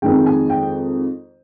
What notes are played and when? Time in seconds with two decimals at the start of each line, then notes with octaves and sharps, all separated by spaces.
0.02 F2 D#3 G#3 G5
0.26 G#5
0.50 G5